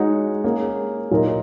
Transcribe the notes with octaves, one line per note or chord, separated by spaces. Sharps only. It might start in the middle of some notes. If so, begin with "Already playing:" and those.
Already playing: G#3 D#4 F#4 C#5
A#3 C#4 G#4
A#2 F#3 D#4 A#4 D#5